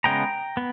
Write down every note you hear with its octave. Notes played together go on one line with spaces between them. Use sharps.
C#3 G#3 B3 G5 A#5
B3